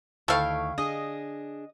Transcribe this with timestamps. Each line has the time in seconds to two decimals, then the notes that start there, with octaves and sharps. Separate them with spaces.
0.28 D2 D#3 E4 A4 F5 G5 C#6
0.78 D4 G#4 D#5